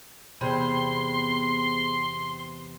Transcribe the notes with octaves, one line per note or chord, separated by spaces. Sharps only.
E2 C3 B3 C4 G#4 C6